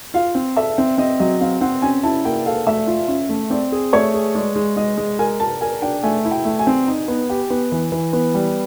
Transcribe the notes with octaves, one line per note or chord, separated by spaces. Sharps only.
F4 F5
C4
A4 E5
C4
C4 D#5
F#3 D#5
C4 F5
C4 F#5
C#4 G#5
E4 A5
A#3 G5
A4 F5
A3 E5
F4
C#4
A3
C4 D5
G#4
A3 C#5
G#4
G#3 D5
G#3
G#3 D#5
G#3
A#4 G#5
A#4 A5
A#4 G#5
D4 G5
A3 G#5
E4
G5
A3
G#5
C4
D#4
B3
G4
B3
E3
E3
B3
G3